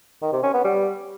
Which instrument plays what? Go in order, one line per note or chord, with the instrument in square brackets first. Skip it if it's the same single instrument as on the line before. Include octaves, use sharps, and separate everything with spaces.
[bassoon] D#3
C3
C#4
B3
G3